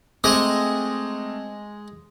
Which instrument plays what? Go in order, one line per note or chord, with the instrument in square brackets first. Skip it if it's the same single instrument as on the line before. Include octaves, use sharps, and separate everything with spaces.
[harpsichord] G#3 D#5 [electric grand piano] A3 C4 D6